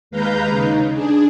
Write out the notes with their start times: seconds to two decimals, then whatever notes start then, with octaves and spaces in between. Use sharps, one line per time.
0.11 D#2 G#3 B4 F5 A#5 G6
0.49 C#3 D#4
0.94 D4 G#4